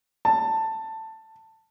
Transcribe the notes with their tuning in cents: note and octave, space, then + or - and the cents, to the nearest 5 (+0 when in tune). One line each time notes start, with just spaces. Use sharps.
A5 +10